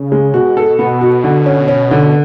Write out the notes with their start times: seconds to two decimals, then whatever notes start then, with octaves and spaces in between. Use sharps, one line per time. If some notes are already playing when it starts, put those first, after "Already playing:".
Already playing: C#3
0.12 G#3
0.34 B2 F#4
0.57 A4
0.79 B3
1.01 F#4
1.24 D3
1.46 C#4
1.68 C#4
1.91 D3